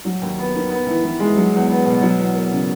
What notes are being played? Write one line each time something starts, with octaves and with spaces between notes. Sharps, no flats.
F#3
D#2
B3
D#3
B3
E3
E3
G#3
F#3
E2
B3
B2
F#3
E2
A#3
C#3